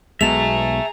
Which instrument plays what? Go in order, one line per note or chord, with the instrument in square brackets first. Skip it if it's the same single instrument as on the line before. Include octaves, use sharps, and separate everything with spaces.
[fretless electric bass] B1 B2 G#3 [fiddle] G#4 A#5 [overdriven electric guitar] E5 A5 [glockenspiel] F7